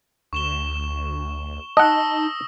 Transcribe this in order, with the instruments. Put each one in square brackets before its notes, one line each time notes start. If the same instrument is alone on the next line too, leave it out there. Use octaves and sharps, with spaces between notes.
[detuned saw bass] D2 [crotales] C#6 E7 G7
[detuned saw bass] D#4 [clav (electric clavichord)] D#5 F#5 [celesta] A5 [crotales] D#6 E6 A#6